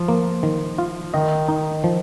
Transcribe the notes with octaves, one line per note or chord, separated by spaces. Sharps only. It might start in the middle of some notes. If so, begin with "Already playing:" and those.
Already playing: F3
A#3
D#3
F4
D#3 D#5
D#4
F3